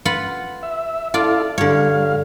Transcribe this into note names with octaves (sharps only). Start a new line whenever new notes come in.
F4 B4 F#5
E5
E4 F4 A4 D5 F5
G2 D3 C#5 F5